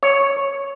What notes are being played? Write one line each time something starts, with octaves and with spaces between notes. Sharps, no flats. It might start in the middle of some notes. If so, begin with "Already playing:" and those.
C#5